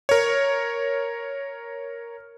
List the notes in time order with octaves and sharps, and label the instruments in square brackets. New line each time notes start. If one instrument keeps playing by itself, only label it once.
[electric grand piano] A#4 C#5